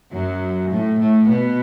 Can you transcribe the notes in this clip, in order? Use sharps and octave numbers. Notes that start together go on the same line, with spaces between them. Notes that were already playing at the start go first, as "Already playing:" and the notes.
F#2 F#3
A2 A3
A2 A3
B2 B3